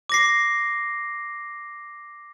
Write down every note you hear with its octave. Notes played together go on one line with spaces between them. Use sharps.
D6 A#6 C7